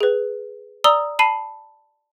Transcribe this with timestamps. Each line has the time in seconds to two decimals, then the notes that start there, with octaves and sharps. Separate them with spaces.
0.01 G#4 B4
0.84 D5 A#5 D#6 E6 G7
1.19 A5 B5 C7 D#7